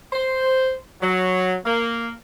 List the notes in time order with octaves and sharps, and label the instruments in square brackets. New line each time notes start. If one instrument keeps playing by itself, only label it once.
[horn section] C5
F#3
A#3